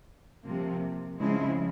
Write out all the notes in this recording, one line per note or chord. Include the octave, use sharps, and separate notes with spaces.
C3 F3 A#3
C#3 F3 G#3 C4 E4